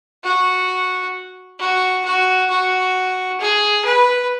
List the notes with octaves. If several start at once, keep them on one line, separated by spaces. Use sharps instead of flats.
F#4
F#4
F#4
F#4
G#4
B4